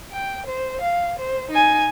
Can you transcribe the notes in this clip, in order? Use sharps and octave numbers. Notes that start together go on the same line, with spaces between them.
G5
C5
F5
C5
D#4 G#5